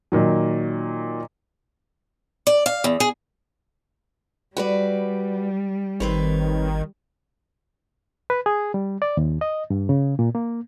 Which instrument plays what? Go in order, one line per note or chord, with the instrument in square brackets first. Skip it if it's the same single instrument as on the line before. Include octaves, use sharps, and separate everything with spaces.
[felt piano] A#2 D#3 F#3
[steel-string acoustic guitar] D5
F5
E2
G#4
[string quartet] G3 [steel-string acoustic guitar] F#4 B4 D5
[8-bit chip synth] G#1 [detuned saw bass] D#3 [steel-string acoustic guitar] C4 B4 C#5
[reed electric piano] B4
G#4
G3
D5
D#2
D#5
G2
C#3
A#2
A#3